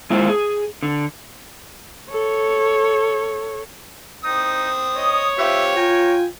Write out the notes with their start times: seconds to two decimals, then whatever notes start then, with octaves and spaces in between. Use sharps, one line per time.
0.10 G#3 A#3 E4 F4 C5
0.29 G#4
0.82 D3
2.11 A4 C#5
4.25 C4 D#4 D#6
4.96 C#5 D#5
5.38 C4 F4 G4 E5
5.77 F4 A#4 G5 G#5